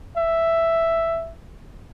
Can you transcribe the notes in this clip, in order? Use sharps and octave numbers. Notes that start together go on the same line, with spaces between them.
E5